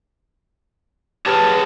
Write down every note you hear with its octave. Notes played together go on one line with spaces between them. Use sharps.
G4 G#4 B4 C#5 A5 F6